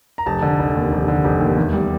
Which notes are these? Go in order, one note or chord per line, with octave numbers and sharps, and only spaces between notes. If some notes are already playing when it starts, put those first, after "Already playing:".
A#5
F1 A5
D3
F1
D#2
F1
D3
F1
D#2
E2
G3